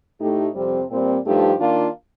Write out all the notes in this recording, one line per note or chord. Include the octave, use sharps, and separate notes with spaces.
A2 A3 D#4 G4
F2 C3 G3 C4
A#2 G3 C4
G2 F3 A3 D#4 G4
D#3 A#3 D4 F4